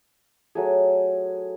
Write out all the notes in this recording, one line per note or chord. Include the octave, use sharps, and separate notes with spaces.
F#3 A3 G#4